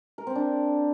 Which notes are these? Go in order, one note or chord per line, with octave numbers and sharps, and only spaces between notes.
A#4
C4
D4